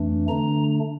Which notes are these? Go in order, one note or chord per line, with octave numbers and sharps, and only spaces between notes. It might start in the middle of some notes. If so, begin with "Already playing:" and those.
Already playing: F2 E3 A3 D4
D3 A3 D4 A#5